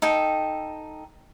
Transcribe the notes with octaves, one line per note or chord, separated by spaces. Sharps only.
D#4 A4 G5